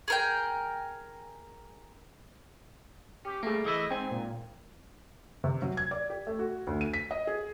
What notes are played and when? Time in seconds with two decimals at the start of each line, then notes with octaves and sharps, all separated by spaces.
0.08 G#4 A#4 G5
3.25 C#4 G4
3.43 G3 A3 A#3 G#4 D7
3.65 E3 A3 E4 D#5
3.91 G#2 C4 G5 G#5
4.11 A#2
5.44 C3
5.62 F#3
5.77 G#6
5.91 D5
6.10 G4
6.27 A3
6.39 F#4
6.67 D2
6.81 D#7
6.93 B6
7.11 D#5
7.27 G#4